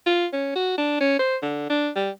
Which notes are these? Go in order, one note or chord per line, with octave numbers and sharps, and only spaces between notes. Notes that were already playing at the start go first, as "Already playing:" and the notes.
F4
C#4
F#4
D4
C#4
C5
D3
D4
G3